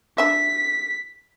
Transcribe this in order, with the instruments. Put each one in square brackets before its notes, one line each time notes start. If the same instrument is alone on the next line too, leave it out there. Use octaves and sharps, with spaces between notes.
[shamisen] D4 E5 [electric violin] B6